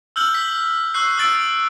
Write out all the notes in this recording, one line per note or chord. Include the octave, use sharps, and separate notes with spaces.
E6 F6 G6 F#7
B6
C#6 E6 F#6 C7
D#6 E6 A6 D7